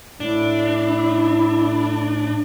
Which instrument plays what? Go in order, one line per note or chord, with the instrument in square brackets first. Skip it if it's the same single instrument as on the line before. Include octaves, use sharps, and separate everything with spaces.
[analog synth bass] A2 [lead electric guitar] D4 [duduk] E4